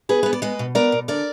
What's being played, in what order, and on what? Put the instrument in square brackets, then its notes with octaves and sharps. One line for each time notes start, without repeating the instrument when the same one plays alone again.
[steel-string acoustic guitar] B3 G#4 B4
B3 B4
D5
G#3 B4 D#5
B2
B3 A#4 D5
B2
D3 A#4 D5